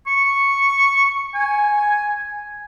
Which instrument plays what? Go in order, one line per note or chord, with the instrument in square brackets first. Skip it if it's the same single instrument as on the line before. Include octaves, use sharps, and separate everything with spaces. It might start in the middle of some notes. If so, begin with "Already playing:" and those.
[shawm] C#6
G#5